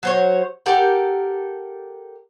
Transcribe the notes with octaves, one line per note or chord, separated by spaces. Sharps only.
F#3 C5 C#5
G4 A4 A#4 F#5